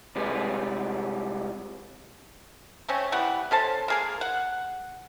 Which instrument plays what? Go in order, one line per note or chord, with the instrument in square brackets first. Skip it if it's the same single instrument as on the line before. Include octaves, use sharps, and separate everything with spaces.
[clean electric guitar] C3 G3 G#3 G#4 B4
[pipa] A3 C4 C#4
E3 G3 B3 F#5
C#4 A4 C5 A5
A#3 G#4 A#4
F#5